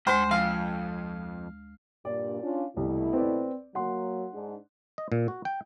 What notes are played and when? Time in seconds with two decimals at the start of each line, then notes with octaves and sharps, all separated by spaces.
0.07 D2 G#2 G#3 C5 C6
0.31 F2 F5
2.05 G2 A#2 D5
2.42 C#4 D4 F4
2.77 C2 B2 A3 E4
3.13 C4 B4 D5
3.75 F#3 A#3 F#5 C6
4.33 G#2 D4
4.98 D#5
5.12 A#2
5.28 F#4
5.45 G5